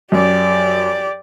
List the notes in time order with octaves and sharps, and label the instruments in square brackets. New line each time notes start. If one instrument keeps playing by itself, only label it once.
[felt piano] F#2 [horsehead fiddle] G4 D5